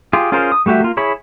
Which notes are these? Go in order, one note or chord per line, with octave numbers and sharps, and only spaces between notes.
F4 G4 G#4
C#4 F4 G#4 A#4 C5
D#6
G3 A3 F#4 G4 E5
A#3 F4
E4 G#4 C#5 B5